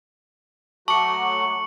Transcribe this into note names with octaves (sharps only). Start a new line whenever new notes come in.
F#3 A3 F#4 A5 C#6 D6 C#7 F#7